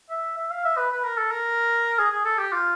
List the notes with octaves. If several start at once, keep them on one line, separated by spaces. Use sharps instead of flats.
E5
E5
F5
E5
B4
B4
A#4
A4
A#4
G#4
G#4
A4
G4
F4